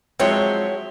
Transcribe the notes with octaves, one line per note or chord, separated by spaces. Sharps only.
F3 F#3 G#3 C4 E4 C#5